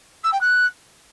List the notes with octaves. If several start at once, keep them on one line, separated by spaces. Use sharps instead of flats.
E6
G5
F#6